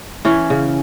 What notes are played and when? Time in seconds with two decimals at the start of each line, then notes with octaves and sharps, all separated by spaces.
0.25 E3 C#4
0.50 C#3